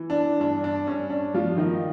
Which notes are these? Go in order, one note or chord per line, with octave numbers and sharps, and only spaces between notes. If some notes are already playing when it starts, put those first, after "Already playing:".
Already playing: E3
D4
G2 D4
D4
G2 C#4
D4
G2 F3 F4
D#3 D#4